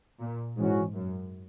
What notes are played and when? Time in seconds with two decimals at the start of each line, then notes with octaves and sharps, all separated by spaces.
0.19 A#2
0.56 G#2 E3 G#3 C#4 F#4
0.94 F#2